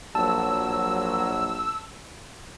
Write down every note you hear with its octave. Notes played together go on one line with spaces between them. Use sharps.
A#1 F#3 A5 E6